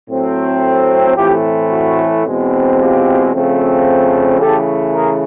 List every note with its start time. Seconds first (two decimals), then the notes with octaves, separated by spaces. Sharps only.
0.09 A2 F#3 A3 C4
1.16 A2 E3 A3 C4 F4 G4
1.71 E4 F#4
2.25 E2 B2 G#3 C4
2.79 F4 G4
3.33 C#3 F3 A3 C4
4.40 C#3 E3 A3 G4 A4
4.95 G#4 A#4